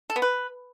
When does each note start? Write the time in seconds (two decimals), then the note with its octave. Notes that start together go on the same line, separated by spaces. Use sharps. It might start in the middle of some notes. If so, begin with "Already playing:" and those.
0.10 A4
0.16 B3
0.22 B4